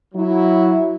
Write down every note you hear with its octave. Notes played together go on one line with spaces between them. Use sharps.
F#3 E4